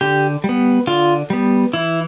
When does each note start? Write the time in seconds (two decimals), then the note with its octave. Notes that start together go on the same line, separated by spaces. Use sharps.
0.01 D3 G4
0.44 G3
0.49 B3
0.87 D3 F4
1.30 G3 B3
1.73 E3 E4